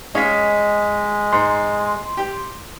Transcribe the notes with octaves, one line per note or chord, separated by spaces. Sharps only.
G#3 C#4 D#5 F5 B6
G#2 C6
G4